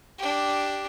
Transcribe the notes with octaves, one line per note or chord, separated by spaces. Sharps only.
D4 G4